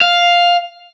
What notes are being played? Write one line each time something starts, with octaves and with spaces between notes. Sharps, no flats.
F5